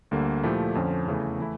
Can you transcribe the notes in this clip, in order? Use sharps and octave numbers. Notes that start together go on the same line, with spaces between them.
D2 D3 G3 A#3
A#2 F3 A3 E4 G4
F2 D3 F3 C#4
E2 C#3 E3 A3
E3 A3 E4